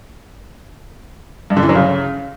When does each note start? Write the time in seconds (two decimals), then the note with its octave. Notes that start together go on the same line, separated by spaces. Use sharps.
1.50 G2
1.57 D3
1.63 E3
1.69 F#3
1.75 C#3